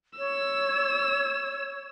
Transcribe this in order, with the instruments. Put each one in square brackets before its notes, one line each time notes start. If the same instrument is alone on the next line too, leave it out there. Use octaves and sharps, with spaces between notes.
[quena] C#5 [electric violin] E6